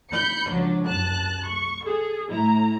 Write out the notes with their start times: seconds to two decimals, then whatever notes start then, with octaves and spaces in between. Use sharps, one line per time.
0.11 B5 G6 C#7
0.51 C#2 F3 F#3 D4
0.86 C2 F#2 A5 F#6
1.47 C#6
1.84 G#4 A4
2.30 A2 E4 A#5